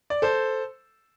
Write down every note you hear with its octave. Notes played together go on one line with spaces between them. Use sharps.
D5
A4 C5